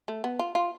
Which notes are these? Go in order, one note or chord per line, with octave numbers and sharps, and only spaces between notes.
A3
B3
F4
F4